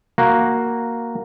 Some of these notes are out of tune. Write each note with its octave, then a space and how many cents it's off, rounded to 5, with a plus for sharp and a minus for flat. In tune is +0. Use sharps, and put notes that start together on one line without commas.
A#3 +0 F#4 +0